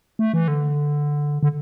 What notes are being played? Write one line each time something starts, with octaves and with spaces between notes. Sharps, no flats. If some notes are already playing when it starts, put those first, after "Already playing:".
A3
E3
D3
D3